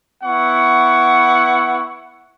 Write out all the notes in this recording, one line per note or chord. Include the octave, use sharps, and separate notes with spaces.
B3 E4 F#5 C#6